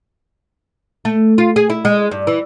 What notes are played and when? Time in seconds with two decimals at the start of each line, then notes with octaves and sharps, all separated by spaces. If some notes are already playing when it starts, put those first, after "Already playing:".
1.05 A3
1.38 F4
1.56 G#4
1.70 E4
1.85 G#3
2.11 G2
2.27 E3